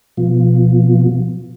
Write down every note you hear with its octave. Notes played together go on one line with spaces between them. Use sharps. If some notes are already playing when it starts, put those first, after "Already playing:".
B2 F3